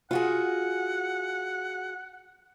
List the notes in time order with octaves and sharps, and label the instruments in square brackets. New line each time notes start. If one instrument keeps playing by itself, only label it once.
[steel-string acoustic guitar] F4 F#4 G#4 [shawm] F#5